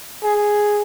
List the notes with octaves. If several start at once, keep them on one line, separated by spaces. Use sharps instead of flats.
G#4